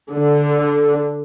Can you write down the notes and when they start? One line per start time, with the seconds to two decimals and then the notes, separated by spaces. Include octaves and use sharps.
0.12 D3